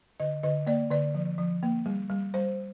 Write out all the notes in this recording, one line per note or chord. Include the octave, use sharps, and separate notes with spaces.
D3 D#5
D3 D#5
A#3 D5
D3 D5
F3
F3
A#3
G3
G3
G3 C5